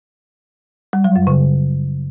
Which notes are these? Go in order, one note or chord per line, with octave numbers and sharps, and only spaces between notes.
G3
F#3
F#2
C#3